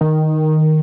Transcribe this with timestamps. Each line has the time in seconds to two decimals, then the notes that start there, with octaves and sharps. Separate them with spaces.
0.01 D#3